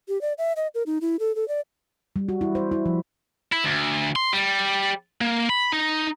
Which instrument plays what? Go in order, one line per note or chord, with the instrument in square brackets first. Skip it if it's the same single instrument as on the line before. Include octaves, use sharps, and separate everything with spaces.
[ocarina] G4
D5
E5
D#5
A#4
D#4
E4
A4
A4
D5
[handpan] G3
F#4
E4
C5
E4
F3
[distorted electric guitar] E4
D2
C6
G3
A#3
B5
D#4